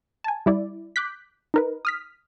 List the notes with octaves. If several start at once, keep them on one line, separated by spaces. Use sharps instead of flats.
G#5 A5
G3 E4 D5
D6 F#6 G6 B6
D#4 A#4 B4
D#6 F6 B6